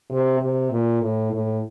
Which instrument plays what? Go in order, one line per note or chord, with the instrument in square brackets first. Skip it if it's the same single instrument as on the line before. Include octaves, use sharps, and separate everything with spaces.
[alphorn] C3
C3
A#2
A2
A2